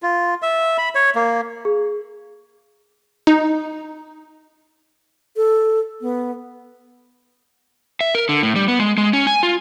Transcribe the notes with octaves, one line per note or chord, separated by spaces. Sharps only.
F4
E5
B5
C#5
A#3
G#4
D#4
A4
B3
E5
A#4
D3
A2
G3
B3
G#3
G#3
C#4
G#5
F4